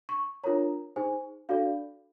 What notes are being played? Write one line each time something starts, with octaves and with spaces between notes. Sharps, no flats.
C#6
D4 F4 A#4 C#5 A#5
D#4 G#4 C5 G#5
D4 F#4 A4 D5 F5